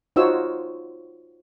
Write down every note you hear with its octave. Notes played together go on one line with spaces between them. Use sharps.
D#4 F4 F#4 C5 C#5 E6